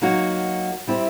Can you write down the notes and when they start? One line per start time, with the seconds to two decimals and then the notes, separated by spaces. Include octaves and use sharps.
0.02 F#3 A#3 D#4 F#4
0.87 G3 C4 E4 G4